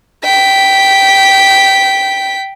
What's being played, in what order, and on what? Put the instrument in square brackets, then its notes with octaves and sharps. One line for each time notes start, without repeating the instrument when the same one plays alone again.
[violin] G5 B6